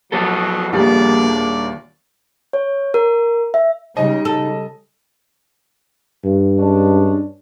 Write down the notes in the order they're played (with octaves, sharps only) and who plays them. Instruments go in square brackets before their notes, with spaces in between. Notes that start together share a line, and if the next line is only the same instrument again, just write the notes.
[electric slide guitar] F3 B3 A4 [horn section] F#3
[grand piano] D#1 D#2 G3 [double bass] A#3 [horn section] D4 G#4 D5
[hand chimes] C#5
A#4
E5
[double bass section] C#3 G3 G#3 [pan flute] D#4 [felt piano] D#5
[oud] A4
[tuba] G2
[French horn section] G#3 C#4 D4